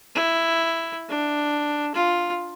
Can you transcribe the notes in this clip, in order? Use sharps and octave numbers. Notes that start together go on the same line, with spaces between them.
E4
D4
F4